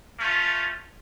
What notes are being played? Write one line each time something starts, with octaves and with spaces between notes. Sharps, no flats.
A3 C#4 F4